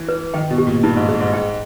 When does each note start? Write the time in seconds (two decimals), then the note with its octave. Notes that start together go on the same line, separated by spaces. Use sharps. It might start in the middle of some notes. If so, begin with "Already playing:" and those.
Already playing: E3
0.09 B4
0.34 D#3 G5
0.50 B2
0.58 G4
0.67 A#2
0.83 G2 D#4
0.96 G#2
1.09 G#4
1.21 G#2
1.34 G5